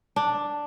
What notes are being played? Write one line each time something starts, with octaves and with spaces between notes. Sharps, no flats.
D4